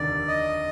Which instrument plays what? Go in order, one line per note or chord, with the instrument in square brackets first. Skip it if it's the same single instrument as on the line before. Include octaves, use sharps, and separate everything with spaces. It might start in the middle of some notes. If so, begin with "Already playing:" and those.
Already playing: [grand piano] F1 D#2 D3 G3 [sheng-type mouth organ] D5
[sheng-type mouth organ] D#5